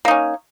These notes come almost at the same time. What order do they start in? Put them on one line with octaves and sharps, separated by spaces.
A#3 D#4 C#4